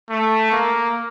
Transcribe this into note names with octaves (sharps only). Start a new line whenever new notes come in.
A3
A#3